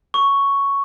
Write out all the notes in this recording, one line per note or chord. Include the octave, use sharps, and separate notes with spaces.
C#6